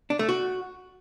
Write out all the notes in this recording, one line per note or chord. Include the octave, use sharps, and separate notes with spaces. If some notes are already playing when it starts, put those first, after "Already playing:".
D4
A3
F#4